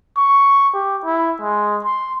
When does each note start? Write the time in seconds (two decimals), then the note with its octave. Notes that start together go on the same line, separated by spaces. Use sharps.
0.17 C#6
0.74 G4
1.05 E4
1.41 G#3
1.84 C6